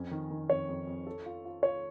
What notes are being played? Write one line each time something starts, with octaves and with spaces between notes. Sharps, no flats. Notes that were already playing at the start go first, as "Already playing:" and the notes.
Already playing: F2 C#4
D#3
D#3
F2 C#5
F2
F2
A4
F4
F4
F4 C#5